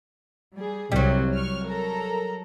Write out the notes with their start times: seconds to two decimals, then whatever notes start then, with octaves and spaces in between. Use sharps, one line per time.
0.55 G3 G#4
0.92 C2 C3 F#3 G3 C4
1.34 C#6 F6
1.66 A4 A#4 A#5